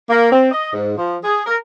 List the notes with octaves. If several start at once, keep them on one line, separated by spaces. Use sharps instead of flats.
A#3
C4
D#5
G#2
F3
G#4
A#4